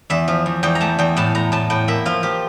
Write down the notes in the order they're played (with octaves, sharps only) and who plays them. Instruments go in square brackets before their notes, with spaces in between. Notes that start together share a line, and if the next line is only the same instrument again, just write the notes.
[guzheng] E2 E5
F3
E2
E2 G5
A#5
A3 A5
E2 G5
A2 A5
A2 A#5
A2 A5
A2 G5
A#3 E5
F3 F4
F3 G4